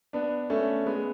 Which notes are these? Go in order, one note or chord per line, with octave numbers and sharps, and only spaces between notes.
B3 D4
A3 C#4
G#3 B3